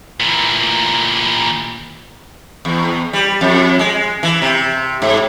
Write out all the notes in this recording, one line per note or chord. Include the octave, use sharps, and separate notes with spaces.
A#2 E3
E2
G3
F2
G#3
E3
C3
G#2